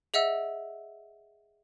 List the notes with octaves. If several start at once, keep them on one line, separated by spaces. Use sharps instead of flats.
G#4 D#5 E5 F#5 E6